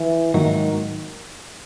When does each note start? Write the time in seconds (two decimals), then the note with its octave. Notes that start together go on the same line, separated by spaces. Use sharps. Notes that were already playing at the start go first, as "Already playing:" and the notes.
Already playing: E3
0.34 G#2 D#3 F#3 A#3 D#4 F#4